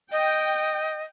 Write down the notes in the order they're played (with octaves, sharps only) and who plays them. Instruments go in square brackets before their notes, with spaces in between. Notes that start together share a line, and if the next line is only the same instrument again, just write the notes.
[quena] D#5 [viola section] G5